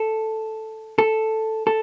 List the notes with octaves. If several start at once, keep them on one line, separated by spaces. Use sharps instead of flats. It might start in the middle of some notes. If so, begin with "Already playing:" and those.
Already playing: A4
A4
A4